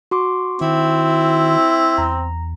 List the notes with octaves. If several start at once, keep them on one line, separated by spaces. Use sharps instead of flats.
F#4 C6 D6
D#3 C4 E4
E2 A#5